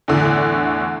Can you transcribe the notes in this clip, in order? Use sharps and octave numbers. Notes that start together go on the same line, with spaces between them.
E2 A2 D3